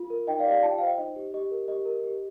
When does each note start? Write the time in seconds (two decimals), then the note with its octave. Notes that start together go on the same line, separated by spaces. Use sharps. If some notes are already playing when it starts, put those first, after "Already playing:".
Already playing: F4
0.10 A#4
0.27 D#4 D#5 G5
0.39 D5 F5
0.46 G4 D#5
0.51 D5 F5
0.63 F4 A5
0.70 G5
0.78 C5 F5
0.86 D#5 G5
0.98 D#4 D#5
1.16 G4
1.34 G4 D#5
1.51 A#4
1.68 G4 D#5
1.85 A#4
2.03 G4